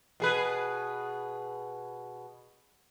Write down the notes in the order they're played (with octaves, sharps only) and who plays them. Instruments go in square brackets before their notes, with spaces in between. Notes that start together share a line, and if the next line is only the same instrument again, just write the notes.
[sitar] B2 G#4 B4